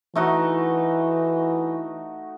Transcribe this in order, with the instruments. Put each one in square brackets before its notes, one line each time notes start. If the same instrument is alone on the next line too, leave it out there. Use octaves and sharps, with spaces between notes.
[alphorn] E3 [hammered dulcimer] A3 D#4 F#4